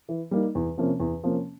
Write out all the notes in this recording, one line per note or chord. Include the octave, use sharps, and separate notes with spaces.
E3
G3 A#3 D#4
E2
C3 F3 A#3 C#4
E2
C3 F3 A#3 C#4